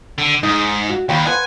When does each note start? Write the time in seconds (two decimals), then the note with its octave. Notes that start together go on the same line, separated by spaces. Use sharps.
0.18 D3
0.43 G#2 D#4
0.89 F#4
1.09 D#2 G5 B5
1.27 B4 C5 F#5 G#5